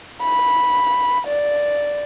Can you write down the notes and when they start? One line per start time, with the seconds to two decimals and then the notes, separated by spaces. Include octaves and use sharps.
0.22 B5
1.27 D5